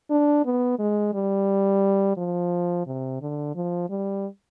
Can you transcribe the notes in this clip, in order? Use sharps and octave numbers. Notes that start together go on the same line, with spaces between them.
D4
B3
G#3
G3
F3
C3
D3
F3
G3